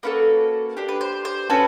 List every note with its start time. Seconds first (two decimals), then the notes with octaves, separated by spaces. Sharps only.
0.03 A#3 C#4 F#4 A4 B4
0.77 D4 G4
0.88 B4
1.01 C5
1.25 C5
1.50 C#4 F#4 A4 B4